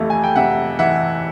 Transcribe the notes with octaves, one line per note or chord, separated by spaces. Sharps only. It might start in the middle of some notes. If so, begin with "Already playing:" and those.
Already playing: F2 C3 E3 A3 F5
G#5
G5
C3 E5 F#5
E3 E5 F#5